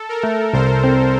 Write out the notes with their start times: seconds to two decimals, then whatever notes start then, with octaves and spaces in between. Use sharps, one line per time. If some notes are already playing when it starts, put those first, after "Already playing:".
Already playing: A4
0.09 A#4
0.23 A3
0.53 C2 C5
0.84 C4